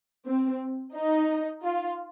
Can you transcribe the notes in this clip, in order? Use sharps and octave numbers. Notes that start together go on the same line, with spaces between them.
C4
D#4
F4